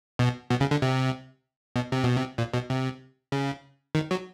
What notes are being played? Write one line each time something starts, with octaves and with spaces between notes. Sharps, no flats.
B2
B2
C#3
D3
C3
B2
C3
B2
C3
A#2
B2
C3
C#3
D#3
F#3